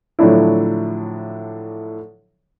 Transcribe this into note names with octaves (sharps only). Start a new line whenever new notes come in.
A2 D3 F3 F#3 D4 E4